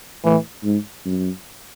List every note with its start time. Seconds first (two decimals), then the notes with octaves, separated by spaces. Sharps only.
0.24 A2 E3
0.64 G#2
1.05 F#2